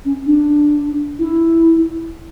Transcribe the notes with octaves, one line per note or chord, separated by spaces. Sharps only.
C#4
D4
E4